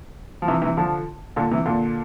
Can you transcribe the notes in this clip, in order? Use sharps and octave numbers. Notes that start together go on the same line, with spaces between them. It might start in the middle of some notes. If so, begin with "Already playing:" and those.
F3
C3 E3
C3 E3
D3 F3
A#2 D3
C3 E3
A#2 D3